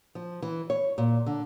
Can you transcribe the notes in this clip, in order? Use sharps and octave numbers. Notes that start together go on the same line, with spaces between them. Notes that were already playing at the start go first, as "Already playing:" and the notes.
F3
E3
C#5
A#2
D3